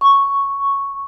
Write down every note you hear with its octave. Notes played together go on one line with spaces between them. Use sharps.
C#6